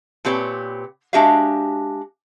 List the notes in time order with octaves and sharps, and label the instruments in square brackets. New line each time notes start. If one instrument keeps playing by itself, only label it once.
[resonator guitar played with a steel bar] A#2 C4 G4 B4 C#5
G#3 D4 F#4 G4 E5 F5